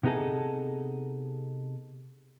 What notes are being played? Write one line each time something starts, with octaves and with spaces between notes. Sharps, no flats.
C3 B3 D#4 G#4 A4